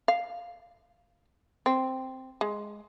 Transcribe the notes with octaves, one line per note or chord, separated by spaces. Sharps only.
F5
C4
G#3